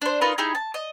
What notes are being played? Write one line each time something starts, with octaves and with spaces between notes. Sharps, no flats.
D4 C5
D#4 F4 A#4 B4
D#4 E4 G4 G#4
A5
D#5